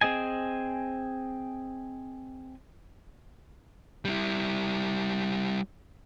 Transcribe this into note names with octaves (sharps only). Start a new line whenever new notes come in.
C4 G#4 D#5 G#5
G3 E4